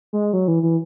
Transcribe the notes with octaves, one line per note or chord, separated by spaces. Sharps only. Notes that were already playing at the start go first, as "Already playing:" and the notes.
G#3
F#3
E3
E3